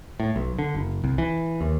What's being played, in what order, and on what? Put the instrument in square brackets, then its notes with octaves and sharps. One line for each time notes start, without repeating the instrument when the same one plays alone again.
[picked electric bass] A2
B1
D3
F#1
C2
E3
D#2